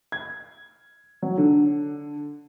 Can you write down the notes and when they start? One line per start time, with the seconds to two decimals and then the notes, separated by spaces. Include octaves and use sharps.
0.12 G#6
1.22 F#3
1.37 D3